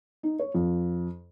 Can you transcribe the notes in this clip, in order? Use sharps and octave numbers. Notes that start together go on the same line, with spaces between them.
D#4
C#5
F2